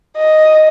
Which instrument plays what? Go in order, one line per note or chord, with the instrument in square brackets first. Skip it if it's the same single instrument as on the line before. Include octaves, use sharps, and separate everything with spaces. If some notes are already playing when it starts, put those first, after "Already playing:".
[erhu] D#5